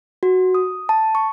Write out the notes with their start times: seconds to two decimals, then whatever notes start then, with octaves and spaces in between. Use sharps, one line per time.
0.23 F#4
0.55 D#6
0.89 A5
1.15 C#6